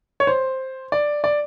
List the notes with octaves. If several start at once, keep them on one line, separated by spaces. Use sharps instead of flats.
C#5
C5
D5
D5